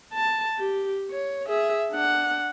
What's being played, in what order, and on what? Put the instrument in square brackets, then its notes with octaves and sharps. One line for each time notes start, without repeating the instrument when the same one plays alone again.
[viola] A5
G4
C#5
G#4 E5
D4 F#5